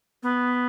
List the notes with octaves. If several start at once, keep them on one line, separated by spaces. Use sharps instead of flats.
B3